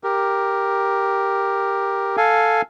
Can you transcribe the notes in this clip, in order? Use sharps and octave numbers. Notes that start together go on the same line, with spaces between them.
G4 A#4
A4 F5 G#5